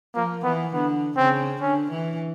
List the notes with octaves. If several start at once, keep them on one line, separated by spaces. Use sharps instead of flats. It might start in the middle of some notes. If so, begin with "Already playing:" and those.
F3 A#3
E3 B3
D3 B3
C#3 C4
D3 C#4
E3